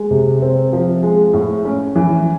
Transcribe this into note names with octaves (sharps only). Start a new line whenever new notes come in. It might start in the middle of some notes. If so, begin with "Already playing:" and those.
Already playing: G#3
C3
C4
F3
G#3
A2
C#4
E3